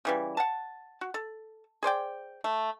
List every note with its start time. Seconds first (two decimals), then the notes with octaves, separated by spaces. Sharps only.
0.05 C#3 E3 G3
0.37 F#5 A5
1.01 F#4
1.14 A4
1.83 G#4 C5 D5 G5
2.44 A3